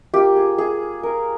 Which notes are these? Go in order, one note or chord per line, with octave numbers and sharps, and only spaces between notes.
A#3 F4 G4
G#4
G#4
A#4